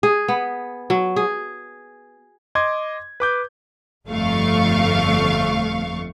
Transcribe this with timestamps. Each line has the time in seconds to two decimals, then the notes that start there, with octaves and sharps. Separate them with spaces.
0.03 G#4
0.28 B3
0.90 F#3
1.16 G#4
2.55 D#5 C6 D6 G#6
3.20 B4 D6 G6
4.07 G1 F2 A3 F5 C#6